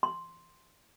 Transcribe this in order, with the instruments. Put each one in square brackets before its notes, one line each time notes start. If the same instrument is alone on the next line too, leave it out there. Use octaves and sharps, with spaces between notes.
[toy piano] C6